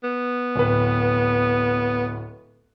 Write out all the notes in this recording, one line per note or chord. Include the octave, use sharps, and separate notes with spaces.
B3
D1 B4